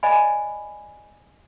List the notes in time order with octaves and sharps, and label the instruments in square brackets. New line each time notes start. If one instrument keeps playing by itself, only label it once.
[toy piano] C5 D5 D#5 F5 G#5 B5